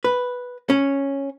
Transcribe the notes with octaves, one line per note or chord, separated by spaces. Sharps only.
B4
C#4